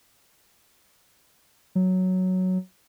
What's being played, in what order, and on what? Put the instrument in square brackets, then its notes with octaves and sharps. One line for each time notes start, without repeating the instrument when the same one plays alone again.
[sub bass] F#3